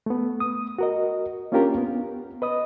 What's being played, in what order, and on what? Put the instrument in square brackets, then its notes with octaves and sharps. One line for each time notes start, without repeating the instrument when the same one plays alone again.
[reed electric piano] A3 B3
D#6
F#4 A#4 D#5
A#3 C#4 D4 F4 G4 A#4
B3
B4 D#5 D#6